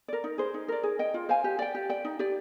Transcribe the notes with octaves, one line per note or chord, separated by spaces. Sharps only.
A#4 D5
D#4
G#4 C5
D#4
A#4 D5
G#4
D#5 G5
F4
C5 F5 G#5
G4
D5 G5
G4
D5 G5
D#4
G4 D5